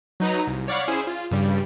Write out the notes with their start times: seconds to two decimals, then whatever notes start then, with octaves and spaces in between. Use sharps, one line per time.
0.20 F#3 D#4 B4 A#5
0.47 C2
0.68 C#5 D5 F5 F#5 B5 C#6
0.88 C#4 E4 G#4 C5
1.07 F4
1.31 G2 C#3 G3